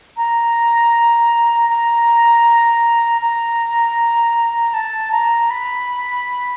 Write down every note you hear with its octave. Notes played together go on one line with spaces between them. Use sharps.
A#5
A#5
A#5
A5
A#5
B5